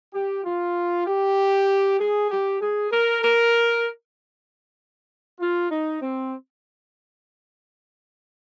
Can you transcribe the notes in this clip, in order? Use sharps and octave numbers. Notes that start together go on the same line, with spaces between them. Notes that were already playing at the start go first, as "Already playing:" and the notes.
G4
F4
G4
G#4
G4
G#4
A#4
A#4
F4
D#4
C4